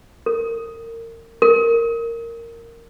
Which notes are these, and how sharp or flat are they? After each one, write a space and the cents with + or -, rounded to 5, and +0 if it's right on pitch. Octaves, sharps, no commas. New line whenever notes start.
A#4 -30
A#4 -10